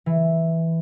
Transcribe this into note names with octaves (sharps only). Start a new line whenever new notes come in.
E3